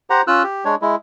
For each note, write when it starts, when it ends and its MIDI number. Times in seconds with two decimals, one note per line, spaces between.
0.10 0.22 67
0.10 0.22 72
0.10 0.22 78
0.10 0.22 82
0.27 0.43 61
0.27 0.43 65
0.27 0.43 88
0.27 0.43 90
0.43 0.64 67
0.65 0.75 56
0.65 0.75 62
0.65 0.75 73
0.82 0.95 56
0.82 0.95 64